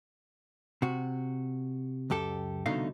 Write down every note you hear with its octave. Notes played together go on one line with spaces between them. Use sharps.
C3 F#4
C#2 F#2 G4 A4
C2 B2 D3 A3 D#4 F5